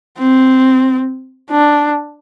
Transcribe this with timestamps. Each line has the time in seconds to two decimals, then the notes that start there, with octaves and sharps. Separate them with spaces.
0.19 C4
1.50 D4